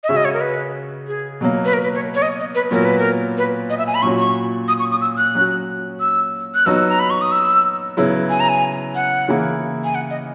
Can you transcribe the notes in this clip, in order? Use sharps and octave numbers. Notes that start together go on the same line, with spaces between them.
D#5
C#3 G#3 C#4 F#4 E5
D#5
C#5
A#4
B4
G#4
B2 F#3 A#3
B4
A#4
B4
C#5
C#5
D#5
D#5
B4
A#2 F#3 B3 F#4 A#4
B4
A#4
B4
D#5
E5
G#5
B5
A#2 F#3 C#4 F#4 C#6
C#6
D#6
C#6
D#6
E6
F#6
F#3 C#4 F#4
E6
F#6
F#3 B3 D#4 F#4 E6
A#5
B5
C#6
D#6
E6
C#3 F#3 B3 E4
G#5
A#5
G#5
F#5
C#3 E3 A#3 E4
G#5
F#5
D#5